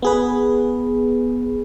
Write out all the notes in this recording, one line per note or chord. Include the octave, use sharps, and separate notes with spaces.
B3 G#4 B4